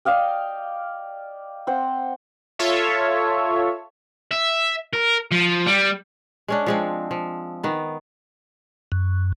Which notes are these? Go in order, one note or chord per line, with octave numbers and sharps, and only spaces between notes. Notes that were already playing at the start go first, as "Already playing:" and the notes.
D5 D#5 F5 G5
C4 C5 F#5
F4 A4 C#5 E5
E5
A#4
F3
G3
G#3 C#4 D4
F3 G#3 C4
F3
D#3 B3
F#2